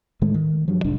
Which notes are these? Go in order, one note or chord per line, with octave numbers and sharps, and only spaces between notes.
A2 D#3 G#3 A3
D#3
G2 F3 F#3
F1 C2 G#2 D4